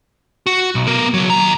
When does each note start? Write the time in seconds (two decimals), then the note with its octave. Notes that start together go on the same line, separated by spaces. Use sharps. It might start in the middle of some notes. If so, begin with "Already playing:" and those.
0.46 F#4
0.75 B1
0.87 B3 A#4
1.14 C#3 F#3
1.30 D#2 A#5